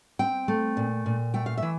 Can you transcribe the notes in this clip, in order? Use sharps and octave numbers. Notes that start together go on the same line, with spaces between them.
C4 G5
A3
A#2
A#2
A3 G5
F5
E5
E3